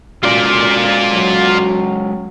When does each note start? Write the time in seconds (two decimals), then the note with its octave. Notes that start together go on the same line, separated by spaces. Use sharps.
0.24 G#3 C#4 F4 F#4 D5
1.14 F#3